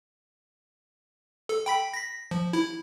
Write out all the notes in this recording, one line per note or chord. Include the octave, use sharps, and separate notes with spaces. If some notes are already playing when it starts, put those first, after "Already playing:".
A4
G5 B5 B6
A#6 B6
F3
E4